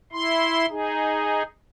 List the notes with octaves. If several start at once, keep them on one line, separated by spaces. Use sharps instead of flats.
E4 C6
D#4 G#4